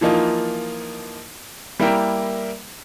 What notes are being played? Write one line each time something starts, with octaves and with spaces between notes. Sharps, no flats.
E3 F3 A#3 D#4 F4
G3 A#3 E4 A#4 G5